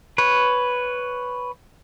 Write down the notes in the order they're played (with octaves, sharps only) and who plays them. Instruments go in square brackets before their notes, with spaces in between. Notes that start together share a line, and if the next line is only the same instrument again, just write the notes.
[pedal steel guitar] B4 C#5